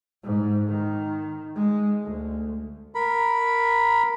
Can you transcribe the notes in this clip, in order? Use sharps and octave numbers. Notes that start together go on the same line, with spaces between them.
G#2
D#3
G#3
D2
A#4 B5